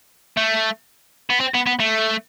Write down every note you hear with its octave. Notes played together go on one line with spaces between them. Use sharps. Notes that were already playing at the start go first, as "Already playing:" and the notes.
A3
B3
C4
B3
B3
A3